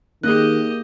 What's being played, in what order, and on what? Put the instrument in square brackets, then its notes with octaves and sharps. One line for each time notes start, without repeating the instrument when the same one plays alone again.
[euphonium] D#3 [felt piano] A#3 [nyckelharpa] G4 D#5 [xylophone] G#4 F#6